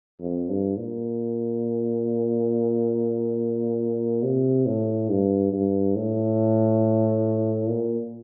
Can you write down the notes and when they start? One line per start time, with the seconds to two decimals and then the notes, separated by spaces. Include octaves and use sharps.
0.21 F2
0.49 G2
0.78 A#2
4.23 C3
4.66 A2
5.10 G2
5.53 G2
5.96 A2
7.69 A#2